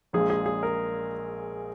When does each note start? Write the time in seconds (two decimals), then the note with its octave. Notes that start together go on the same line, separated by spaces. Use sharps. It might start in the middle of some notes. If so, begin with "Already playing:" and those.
0.13 A#1 A#2 G#3 G#4
0.30 G#4
0.46 G#4
0.63 A#4